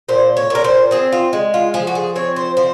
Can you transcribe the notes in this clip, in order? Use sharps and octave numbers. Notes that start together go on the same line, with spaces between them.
A#2 C5
C#5
A#2 A#4
C5
C4 G#4
F4
G#3
F4
F3 G#4
F#4
G#4
C4 C#5
C5
F3 C5